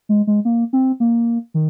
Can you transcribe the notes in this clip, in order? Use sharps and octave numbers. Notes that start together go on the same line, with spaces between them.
G#3
G#3
A#3
C4
A#3
D#3